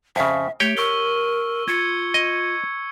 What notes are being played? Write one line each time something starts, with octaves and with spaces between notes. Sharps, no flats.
F2 C#3 E5
A3 G4 C#5 G5
A#4 C#6 E6 G7
F4 G#6 C#7
D#5